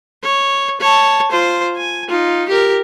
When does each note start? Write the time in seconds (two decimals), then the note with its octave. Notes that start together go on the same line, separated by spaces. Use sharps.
0.23 C#5
0.80 C#5 A5
1.31 F4 C5
1.77 G#5
2.10 D#4 F4
2.49 G4 A#4